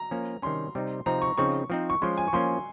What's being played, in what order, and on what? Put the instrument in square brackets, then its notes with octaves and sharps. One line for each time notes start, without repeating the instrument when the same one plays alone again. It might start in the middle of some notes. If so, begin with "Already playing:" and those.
Already playing: [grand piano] A#5
[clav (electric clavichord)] F3 A#3 C#4
[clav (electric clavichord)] C3 D#3 G3 C#4 [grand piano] C6
[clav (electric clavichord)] C3 G3 C4 D#4
[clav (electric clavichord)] C3 F3 C4 D#4 [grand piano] A#5
[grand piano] C#6
[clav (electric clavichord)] C#3 F3 C4 D#4 [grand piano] C#6
[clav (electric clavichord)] F3 C4 D#4
[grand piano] C#6
[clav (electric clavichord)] F3 G#3 C#4 [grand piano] C6
[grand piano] G#5
C#6
[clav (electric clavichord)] F3 A#3 C#4 [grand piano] C6